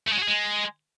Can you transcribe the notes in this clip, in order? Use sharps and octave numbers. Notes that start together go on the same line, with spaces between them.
A3
G#3
F#4
G#4
G#3